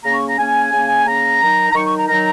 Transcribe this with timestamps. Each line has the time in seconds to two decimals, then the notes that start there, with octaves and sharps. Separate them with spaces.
0.04 C#3 A#3 C#4 A#5
0.16 C#6
0.27 A#5
0.38 C#3 A#3 C#4 G#5
0.73 C#3 A#3 C#4
1.06 C#3 A#3 C#4 A#5
1.42 D#3 F#3 D#4
1.71 A#5
1.75 D#3 F#3 D#4 C#6
1.86 C#6
1.98 A#5
2.09 D#3 F#3 D#4 A#5